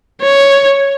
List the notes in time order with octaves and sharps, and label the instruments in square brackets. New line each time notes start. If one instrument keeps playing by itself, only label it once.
[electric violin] C#5